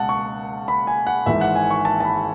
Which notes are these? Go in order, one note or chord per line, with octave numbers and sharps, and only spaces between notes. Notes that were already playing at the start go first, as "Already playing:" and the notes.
Already playing: C#2 B2 F#5 A5
C#6
B5
G#5
F#5
G#1 G#2 E3 E5
F#5
G#5
C#6
A5
A5
B5